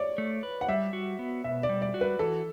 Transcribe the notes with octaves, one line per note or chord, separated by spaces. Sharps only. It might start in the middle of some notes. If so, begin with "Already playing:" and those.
Already playing: C#5 D5
A3
B4
F#5
G3 E5
F#4
B3
B2 E5
D5
G3
D5
F#4
B4
E3 A4